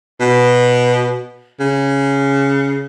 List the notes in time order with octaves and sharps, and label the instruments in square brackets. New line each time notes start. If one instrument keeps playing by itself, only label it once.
[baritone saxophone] B2
C#3